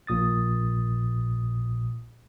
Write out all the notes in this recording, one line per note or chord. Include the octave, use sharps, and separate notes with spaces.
A#1 A#2 D#6 A6